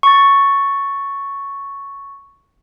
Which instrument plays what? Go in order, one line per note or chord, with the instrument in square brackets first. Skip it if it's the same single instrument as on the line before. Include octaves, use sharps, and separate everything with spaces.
[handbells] C#6 A6